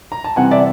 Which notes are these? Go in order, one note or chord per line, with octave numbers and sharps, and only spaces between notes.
A#5
A5
C3 E3 G3 C4 F#5 G#5
D5 E5